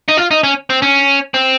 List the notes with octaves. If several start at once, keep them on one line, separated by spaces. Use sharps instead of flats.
D#4
F4
D#4
C#4
C4
C#4
C4